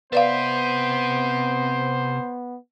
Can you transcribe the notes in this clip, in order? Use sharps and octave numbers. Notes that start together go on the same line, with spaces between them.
C3 B3 B4 C5 D5 E5 F5